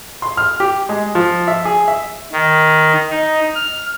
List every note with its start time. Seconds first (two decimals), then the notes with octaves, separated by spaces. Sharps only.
0.22 C6
0.37 F6
0.60 G4
0.89 G#3
1.15 F3
1.48 E5
1.65 G#4
1.88 E5
2.32 D#3
3.10 D#4
3.55 F6